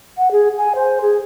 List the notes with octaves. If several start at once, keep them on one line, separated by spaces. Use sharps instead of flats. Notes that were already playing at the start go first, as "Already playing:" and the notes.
F#5
G#4
G#5
C5
G#4